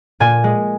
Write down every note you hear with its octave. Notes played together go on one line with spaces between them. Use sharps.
A#2 G#5
G#3